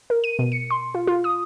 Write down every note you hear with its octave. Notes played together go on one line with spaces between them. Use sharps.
A#4
D#7
B2
C#7
C6
F4
F4
D#6